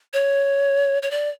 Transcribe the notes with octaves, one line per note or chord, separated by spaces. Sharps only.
C#5
C#5
D5